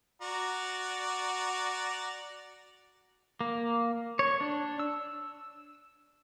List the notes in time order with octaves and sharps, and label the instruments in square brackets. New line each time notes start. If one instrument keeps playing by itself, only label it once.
[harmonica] F#4 D5 A#5
[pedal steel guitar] A#3
C#5
D4
E6